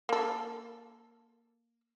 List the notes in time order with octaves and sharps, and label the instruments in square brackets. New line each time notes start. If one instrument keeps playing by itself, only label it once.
[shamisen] A#3 A4